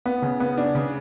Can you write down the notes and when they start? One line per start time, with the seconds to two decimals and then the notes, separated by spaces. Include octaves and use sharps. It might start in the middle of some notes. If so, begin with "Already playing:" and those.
0.06 B3
0.22 C#3
0.40 B3
0.58 D4
0.75 C#3